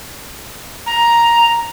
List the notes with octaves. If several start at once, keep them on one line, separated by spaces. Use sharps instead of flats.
A#5